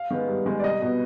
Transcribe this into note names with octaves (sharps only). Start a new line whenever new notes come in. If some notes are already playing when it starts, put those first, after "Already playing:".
Already playing: F5
D#3 G#3 B3
G2
D#3 G#3 B3
D5
C2 D#5
B2 B3